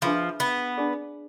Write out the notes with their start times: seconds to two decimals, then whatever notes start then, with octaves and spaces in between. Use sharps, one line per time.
0.02 F3 D4 G#4 B4 E5 B5
0.40 B3
0.77 D4 G#4 D5